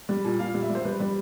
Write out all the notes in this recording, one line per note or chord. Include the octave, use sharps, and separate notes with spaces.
G3
A#2
A#2 F5
G3
E5
G3
C5
G3 B4
G3